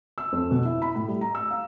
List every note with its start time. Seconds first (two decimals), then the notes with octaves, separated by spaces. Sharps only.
0.18 E6
0.32 F2
0.51 B2
0.65 E4
0.82 B5
0.95 A2
1.08 G3
1.21 A#5
1.35 E6
1.51 F5